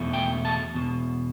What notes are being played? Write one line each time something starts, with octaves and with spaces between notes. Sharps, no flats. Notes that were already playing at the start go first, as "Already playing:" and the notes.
Already playing: E2 B2 A3
G5
A5
E2 B2